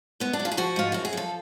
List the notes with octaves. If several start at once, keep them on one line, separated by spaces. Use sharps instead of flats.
G#2 B3
D4
F#3
F4
G#4
F3 F#4
G#2 F4
F#2 F#4
G#4
F3 A4